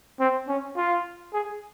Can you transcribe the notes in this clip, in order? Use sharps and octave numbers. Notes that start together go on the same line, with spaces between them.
C4
C#4
F4
G#4